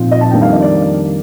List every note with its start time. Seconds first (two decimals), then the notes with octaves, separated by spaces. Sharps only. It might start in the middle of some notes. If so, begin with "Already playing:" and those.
Already playing: A#2 F3 C4 D#4
0.11 D#5
0.21 A5
0.31 F2 D#3 G3 A#3 D4 G5
0.42 F5
0.53 D#5
0.62 D5